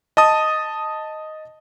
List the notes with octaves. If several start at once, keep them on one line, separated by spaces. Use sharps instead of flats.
D#5 A5 D#6